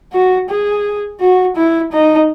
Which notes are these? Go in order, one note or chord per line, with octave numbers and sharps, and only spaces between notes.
F#4
G#4
F#4
E4
D#4